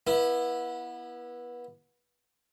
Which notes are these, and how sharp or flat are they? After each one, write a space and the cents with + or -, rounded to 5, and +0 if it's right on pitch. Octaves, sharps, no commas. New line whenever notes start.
B3 -25 E4 +0